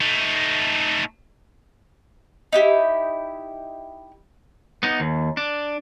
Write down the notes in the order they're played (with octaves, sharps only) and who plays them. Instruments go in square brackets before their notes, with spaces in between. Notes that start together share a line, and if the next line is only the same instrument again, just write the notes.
[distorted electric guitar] A3 D#4
[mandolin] D#4 E4 G4
[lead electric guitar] B3 D#4
D#2
D4